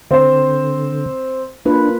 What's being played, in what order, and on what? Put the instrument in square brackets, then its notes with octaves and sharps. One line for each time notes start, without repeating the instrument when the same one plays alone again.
[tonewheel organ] D3 [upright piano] C4 C5
[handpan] A#3 F4 B4 [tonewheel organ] D4